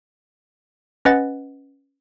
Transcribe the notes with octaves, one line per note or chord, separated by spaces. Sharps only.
C#4 B4 D#5 F#5 A6